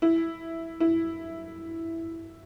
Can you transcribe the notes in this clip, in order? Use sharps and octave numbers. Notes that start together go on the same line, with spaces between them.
E4
E4